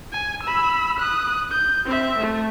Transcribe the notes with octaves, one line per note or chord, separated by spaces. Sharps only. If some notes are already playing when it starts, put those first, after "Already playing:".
G#5
B5 E6
D#6 F#6
G6
C4 E5
A3